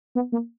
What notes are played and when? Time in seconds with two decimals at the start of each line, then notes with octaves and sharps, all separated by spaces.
0.15 B3
0.32 A#3